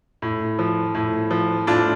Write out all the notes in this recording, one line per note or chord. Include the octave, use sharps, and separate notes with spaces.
A2
F3
A2
F3
A2 D4 F4